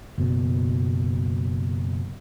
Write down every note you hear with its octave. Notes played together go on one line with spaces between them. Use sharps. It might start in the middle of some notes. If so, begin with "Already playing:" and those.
F#1 B2